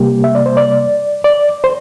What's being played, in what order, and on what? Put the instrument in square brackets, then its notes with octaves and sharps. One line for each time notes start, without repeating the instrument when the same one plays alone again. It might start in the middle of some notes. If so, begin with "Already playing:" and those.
Already playing: [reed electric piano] C3 G3 A#3 G4
E5
D5
C5
D5
D5
C5